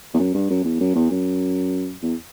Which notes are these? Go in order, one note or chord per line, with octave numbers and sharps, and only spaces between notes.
E2
F#2
G2
F#2
E2
F#2
E2
F#2
E2